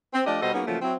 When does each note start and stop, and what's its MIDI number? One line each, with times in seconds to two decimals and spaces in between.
0.14 0.21 60
0.26 0.38 53
0.26 0.38 57
0.26 0.38 62
0.26 0.38 67
0.26 0.38 74
0.26 0.38 75
0.42 0.53 47
0.42 0.53 55
0.42 0.53 66
0.42 0.53 69
0.42 0.53 72
0.42 0.53 75
0.54 0.62 54
0.54 0.62 58
0.54 0.62 59
0.54 0.62 61
0.54 0.62 63
0.54 0.62 68
0.67 0.78 49
0.67 0.78 53
0.67 0.78 54
0.67 0.78 57
0.67 0.78 58
0.67 0.78 65
0.82 0.96 54
0.82 0.96 60
0.82 0.96 64